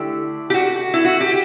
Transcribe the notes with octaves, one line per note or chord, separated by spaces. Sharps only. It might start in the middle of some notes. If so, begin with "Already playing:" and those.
Already playing: D3 A3 E4 G4
G4
F#4
E4
F#4
G4